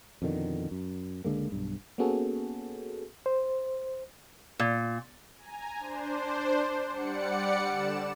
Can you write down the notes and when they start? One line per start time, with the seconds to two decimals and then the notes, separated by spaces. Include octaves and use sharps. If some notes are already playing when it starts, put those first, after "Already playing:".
0.22 F2 B2 D3 D#3
0.71 F#2
1.24 C#2 D3 G#3 A#3
1.52 B1 G2
1.98 A#3 B3 C#4 F#4 G#4 A4
3.26 C5
4.59 A#2
5.37 G#5 A#5
5.78 D4 C5
6.91 G3 D5 F#5 C#7
7.67 D3 E7